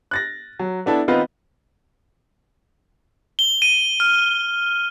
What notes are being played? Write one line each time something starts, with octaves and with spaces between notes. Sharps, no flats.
F#6 A6 A#6
F#3
B3 D4 E4 A4
D#3 B3 C4 D#4 F4 B4
G7
D#7
F6